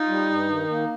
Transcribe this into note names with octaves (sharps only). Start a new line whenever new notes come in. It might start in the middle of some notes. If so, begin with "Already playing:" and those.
Already playing: D#4 F4
G3
G2
D#3
A#3